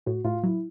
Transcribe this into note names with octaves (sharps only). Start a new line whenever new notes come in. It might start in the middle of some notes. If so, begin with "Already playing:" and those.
A2 F#4
A2 F4
F#3 E4